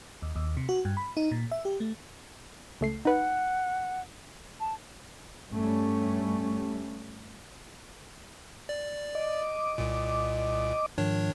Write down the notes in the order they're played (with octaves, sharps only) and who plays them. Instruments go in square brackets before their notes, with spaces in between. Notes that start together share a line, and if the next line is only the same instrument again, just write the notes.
[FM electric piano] D#2
D#2
C3
F#4
G2
B5
D#4
A#2
E5
G4
A3
[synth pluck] C#2 A3 C7
[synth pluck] D#4 B4 [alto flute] F#5
[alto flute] A5
[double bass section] G2 G3 A3 C#4
[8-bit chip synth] D5
[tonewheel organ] D#5 D6
[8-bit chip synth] C2 A#2
[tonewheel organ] G#2 F3 [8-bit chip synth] D#3 D4 C#5